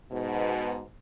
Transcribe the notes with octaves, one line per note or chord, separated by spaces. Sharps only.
G#2 B2